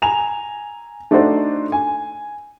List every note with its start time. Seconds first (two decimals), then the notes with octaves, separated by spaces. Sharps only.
0.02 G#5 A#5 F7
1.11 A3 D4 D#4 F#4 C5 D5
1.72 G#5